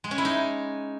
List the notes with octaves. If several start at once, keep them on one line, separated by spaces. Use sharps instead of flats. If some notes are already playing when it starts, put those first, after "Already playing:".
G#3
C#4
E4
D#4